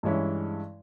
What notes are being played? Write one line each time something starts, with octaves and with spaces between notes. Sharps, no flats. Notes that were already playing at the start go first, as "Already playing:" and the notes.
G2 E3 G#3 C#4 E4